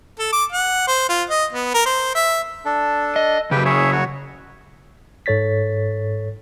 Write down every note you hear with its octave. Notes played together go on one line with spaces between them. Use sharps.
A4
D6
F#5
C5
F4
D#5
B3
A#4
C5
E5
D4 A4
D#5
C#3 F#3 G4 B4 G5
G#4 C#5 E5
F#4 C#5
G#2 A4 C#5 A6 B6